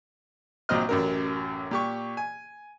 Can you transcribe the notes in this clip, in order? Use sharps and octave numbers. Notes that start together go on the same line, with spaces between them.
A#1 A#2 F#3 C4 D#5 F6
A1 F#2 A#4
A#2 G4 C#6
G#5